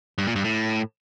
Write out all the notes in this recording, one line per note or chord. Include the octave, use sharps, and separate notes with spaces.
G2
A#2
G2
A2